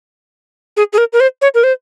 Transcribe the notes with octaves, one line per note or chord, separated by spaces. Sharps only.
G#4
G#4
A#4
A#4
C5
C#5
A#4
C5